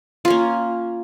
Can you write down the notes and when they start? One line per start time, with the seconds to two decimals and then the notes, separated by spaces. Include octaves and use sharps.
0.25 F4
0.28 C#4
0.30 A#3